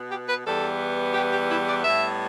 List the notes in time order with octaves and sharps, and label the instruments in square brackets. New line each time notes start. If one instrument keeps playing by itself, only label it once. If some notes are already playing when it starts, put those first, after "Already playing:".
Already playing: [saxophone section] B2 B3
G4
B4
E2 E3 G3 B3 A4
G4
G4
E4
D5
A2 G3 B3 E5